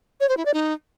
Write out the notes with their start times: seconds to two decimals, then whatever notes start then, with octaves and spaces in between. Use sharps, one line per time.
0.21 C#5
0.29 C5
0.37 E4
0.45 D5
0.54 D#4